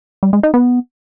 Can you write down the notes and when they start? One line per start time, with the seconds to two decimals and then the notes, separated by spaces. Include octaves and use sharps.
0.23 G3
0.33 G#3
0.43 D#4
0.54 B3